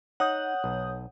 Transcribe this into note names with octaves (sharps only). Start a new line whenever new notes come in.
D#4 C#5 F#5 D#6 G6
B1